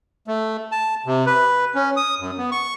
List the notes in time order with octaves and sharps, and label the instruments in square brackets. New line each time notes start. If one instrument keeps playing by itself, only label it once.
[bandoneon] A3
A5
C3
B4
C#4
D#6
F#2
B3
C#6